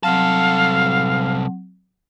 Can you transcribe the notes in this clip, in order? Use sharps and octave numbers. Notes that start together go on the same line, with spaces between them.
C2 F#3 C4 A4 F5 F#5